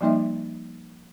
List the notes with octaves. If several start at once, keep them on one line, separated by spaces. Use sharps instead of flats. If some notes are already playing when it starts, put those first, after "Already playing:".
F3 G3 A#3 D#4 D#5 E5